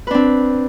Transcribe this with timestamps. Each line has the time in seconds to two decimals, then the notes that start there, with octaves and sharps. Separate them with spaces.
0.07 B4
0.11 D4
0.14 C4